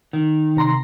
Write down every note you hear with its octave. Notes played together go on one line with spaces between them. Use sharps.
D#3
C3 A#5 C6